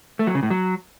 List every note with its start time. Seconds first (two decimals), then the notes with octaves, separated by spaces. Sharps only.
0.19 A3
0.27 F#3
0.35 C#3
0.43 A2
0.50 F#3